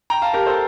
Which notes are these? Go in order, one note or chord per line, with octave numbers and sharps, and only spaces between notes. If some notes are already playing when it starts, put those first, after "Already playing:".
G5 A#5
F5 A5
G4 A#4
A4 C5